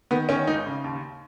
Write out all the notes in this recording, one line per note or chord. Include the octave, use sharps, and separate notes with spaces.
D#3 B3
D#3 C#4
G#1 D#4
C#3
D#2